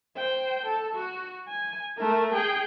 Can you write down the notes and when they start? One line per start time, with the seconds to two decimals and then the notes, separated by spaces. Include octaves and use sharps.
0.16 C5 G5
0.64 A4
0.95 F#4
1.48 G#5
1.97 A3 A#4
2.33 G#4 G5